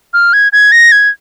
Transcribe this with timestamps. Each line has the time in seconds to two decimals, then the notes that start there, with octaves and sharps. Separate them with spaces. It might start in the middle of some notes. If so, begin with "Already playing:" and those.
0.14 F6
0.33 G#6
0.53 G#6
0.72 A#6
0.92 G#6